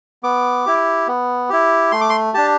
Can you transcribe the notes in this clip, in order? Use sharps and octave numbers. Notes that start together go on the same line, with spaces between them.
B3 D6
E4 G4
B3
E4 G4
A3 C6
D6
C6
D4 G4 A5